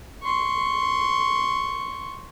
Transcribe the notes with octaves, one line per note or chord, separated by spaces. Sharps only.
C6 C#6